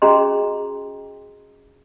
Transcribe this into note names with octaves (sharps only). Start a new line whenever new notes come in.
C#4 F#4 G#4 D#5 A#5 C6